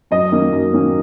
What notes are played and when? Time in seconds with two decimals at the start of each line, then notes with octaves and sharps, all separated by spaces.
0.11 F#2 D#5
0.32 D#3 A#3 C#4
0.52 F#2
0.73 D#3 A#3 C#4